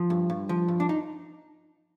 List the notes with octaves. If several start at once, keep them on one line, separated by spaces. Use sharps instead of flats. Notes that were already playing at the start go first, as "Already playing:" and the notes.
Already playing: F3
G2
G2
F3
G2
D4
D#4